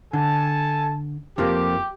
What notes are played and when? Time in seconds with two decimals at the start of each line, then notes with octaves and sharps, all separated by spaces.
0.13 D3 A4 G#5 A5
1.38 F2 F3 A#3 G4